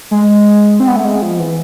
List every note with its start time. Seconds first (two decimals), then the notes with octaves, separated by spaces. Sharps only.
0.11 G#3
0.80 C4
0.88 B3
0.96 A3
1.05 G#3
1.22 F3
1.39 E3